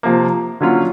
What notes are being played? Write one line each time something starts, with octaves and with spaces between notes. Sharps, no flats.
C3 F3 A#3
D3 F#3 A#3 C#4 F4